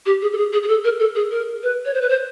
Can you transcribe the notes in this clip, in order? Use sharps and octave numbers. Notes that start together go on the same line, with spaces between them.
G4
G#4
A4
G#4
G#4
G#4
A4
A#4
A4
G#4
A#4
B4
C#5
C5
B4
C5